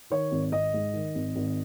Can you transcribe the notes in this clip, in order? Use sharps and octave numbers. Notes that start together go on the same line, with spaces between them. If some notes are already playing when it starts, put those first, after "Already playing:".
D#3 C#5
G#1
G#1 D#5
G#2
D#3
G#1
G#1